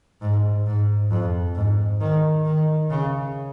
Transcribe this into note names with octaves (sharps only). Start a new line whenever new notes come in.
G#2
G#2
F2
G#2
D#3
D#3
C#3